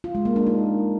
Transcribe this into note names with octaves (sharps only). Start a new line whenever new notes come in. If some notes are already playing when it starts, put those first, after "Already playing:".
F4
G#3
A#3
D4
D#4